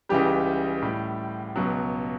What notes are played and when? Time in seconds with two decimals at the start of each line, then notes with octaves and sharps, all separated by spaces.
0.09 C#2 C#3 E3 G3 G4
0.82 A2 G3
1.56 C#2 B2 F#3